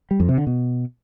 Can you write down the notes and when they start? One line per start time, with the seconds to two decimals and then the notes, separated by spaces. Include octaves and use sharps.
0.11 G3
0.20 F2
0.29 C3
0.38 D3
0.47 B2